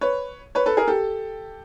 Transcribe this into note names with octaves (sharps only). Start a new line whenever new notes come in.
B4 C#5
B4 C#5
A4 B4
G#4 A#4
G4 A4